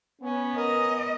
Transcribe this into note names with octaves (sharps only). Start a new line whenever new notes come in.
B3 C#4
A#4 D#5